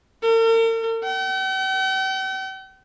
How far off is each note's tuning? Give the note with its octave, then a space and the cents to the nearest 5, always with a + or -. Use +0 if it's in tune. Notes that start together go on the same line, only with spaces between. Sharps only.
A#4 -45
G5 -45